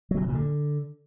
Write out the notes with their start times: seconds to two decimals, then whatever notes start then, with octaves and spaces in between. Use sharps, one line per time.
0.11 F#3
0.17 C3
0.23 B2
0.29 A#2
0.35 D3